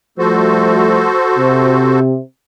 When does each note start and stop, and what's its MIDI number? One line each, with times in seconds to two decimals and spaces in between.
0.19 1.09 53
0.19 1.09 55
0.19 1.09 57
0.19 2.00 66
0.19 2.00 69
0.19 2.00 72
1.38 2.16 48